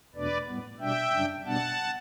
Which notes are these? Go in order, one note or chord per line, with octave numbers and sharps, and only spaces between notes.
E2 B2 A3 D4 B4 D5
A2 G3 B3
B2 G3 D4 E5 G5
F#2 C#3 G3 D4
B2 G3 B3 D4 F#5 A5